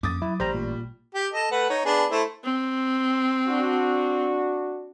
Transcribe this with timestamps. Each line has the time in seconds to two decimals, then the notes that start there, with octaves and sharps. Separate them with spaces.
0.03 F2 A#3 C#4 D6 D#6 A6
0.22 F#3 E4
0.40 A1 G3 C5 A#5
0.55 A#2
1.15 G4
1.33 A4 D#5
1.51 A3 B4 F#5
1.70 D#4 C#5
1.85 B3 D4 G#4
2.11 A3 E4 C5
2.44 C4
3.48 D4 F#4